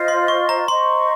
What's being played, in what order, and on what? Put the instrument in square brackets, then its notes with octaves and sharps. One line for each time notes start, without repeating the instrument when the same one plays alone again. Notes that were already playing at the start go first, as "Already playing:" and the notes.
Already playing: [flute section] F4 C5 D#5
[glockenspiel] C6
C#6
A#5
[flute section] C5 D#5 A#5 C#6 [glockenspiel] C6